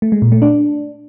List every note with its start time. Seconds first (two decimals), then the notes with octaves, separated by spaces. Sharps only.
0.02 A3
0.12 G#3
0.22 A#2
0.32 A3
0.42 D4